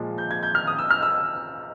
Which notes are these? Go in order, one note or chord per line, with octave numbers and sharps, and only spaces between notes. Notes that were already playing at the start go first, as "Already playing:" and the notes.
Already playing: A#2 F3 G#3
G6
G#6
G6
F6
D#6
E6
F6
E6